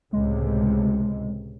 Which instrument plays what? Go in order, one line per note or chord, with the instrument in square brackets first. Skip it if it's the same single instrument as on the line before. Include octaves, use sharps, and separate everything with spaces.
[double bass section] C#2 A2 C3 [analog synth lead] G#3